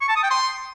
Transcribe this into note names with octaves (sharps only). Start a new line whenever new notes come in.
C#6
A5
D#6
G5
C6